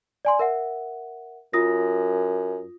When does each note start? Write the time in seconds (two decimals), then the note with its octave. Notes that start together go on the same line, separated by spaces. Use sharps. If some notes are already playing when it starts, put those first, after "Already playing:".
0.25 D5 G#5 C6
0.39 A#4 E5 F#5
1.53 F#2 F4 D#6 A#6